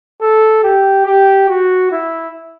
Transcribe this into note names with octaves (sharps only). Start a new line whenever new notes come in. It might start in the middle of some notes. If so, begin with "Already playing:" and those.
A4
G4
G4
F#4
E4